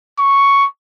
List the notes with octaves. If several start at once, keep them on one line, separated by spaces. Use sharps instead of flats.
C#6